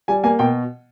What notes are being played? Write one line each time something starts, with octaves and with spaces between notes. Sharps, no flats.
G3 G#5
A#3 G#5
B2 G5